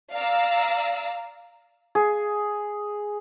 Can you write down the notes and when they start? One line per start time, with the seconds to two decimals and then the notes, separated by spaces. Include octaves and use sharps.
0.13 D5 F5 A#5 E6
1.95 G#4